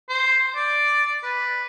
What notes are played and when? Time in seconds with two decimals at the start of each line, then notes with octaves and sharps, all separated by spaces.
0.09 C5
0.56 D5
1.23 B4